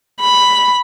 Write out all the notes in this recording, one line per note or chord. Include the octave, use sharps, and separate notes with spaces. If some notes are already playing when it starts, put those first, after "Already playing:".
B5